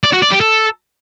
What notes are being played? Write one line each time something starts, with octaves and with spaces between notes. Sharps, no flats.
D5
F#4
D5
G4
A4